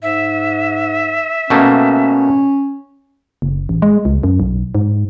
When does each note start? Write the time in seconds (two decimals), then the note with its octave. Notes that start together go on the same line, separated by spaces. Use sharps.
0.03 G#2 E5
1.50 B2 A3 A#3 C#4
3.42 F#1
3.69 A1
3.82 G#3
4.05 C#2
4.23 F#2
4.40 B1
4.75 G#2